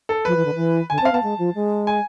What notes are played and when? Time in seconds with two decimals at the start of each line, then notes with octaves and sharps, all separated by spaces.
0.09 A4
0.25 F3 B4
0.36 E3
0.45 D3
0.54 E3
0.90 D3 G#5
0.98 A5
1.01 C4
1.05 F5
1.11 B3
1.14 A5
1.22 G#3
1.38 F3
1.54 G#3
1.87 G#5